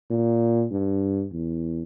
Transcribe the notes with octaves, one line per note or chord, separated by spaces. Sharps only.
A#2
G2
E2